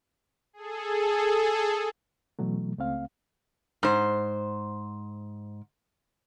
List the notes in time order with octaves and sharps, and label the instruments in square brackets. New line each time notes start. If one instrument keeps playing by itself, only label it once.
[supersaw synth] G#4 A4
[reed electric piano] B2 E3 F#3 A3
C#2 A3 C4 F5
[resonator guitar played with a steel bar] G#2 C5